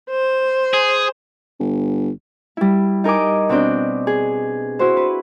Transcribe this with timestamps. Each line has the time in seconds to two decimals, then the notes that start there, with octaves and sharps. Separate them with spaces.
0.10 C5
0.73 G#4
1.60 G1
2.57 G3 E4
3.04 D#4 A#4 D#5 G#5 D6
3.49 B2 C4 D4 D5 G6
4.07 G#4
4.79 E4 F#4 C5
4.97 B4